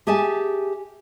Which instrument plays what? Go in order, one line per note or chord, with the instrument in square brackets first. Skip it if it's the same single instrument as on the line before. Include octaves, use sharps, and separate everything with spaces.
[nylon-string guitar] G4 G#4 E5 G#5 A5